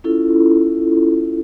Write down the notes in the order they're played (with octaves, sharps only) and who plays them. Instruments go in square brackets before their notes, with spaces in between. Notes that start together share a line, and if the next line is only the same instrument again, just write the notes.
[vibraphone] C#4 E4 F4 A4